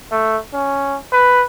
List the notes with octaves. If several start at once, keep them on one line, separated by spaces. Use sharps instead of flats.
A3
C#4
B4